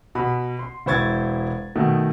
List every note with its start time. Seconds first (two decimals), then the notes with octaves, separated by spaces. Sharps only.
0.15 B2 B5
0.59 C6
0.86 E1 E4 C5 C#6 G#6 A6
1.75 B2 D#3 A3